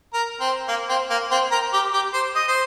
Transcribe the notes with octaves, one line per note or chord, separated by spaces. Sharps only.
A#4
C4
A#3
C4
A#3
C4
A#4
G4
G4
C5
D#5
C5